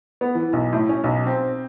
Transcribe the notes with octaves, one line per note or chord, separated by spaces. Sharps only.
B3
E3
B1
A2
C#4
B1
C4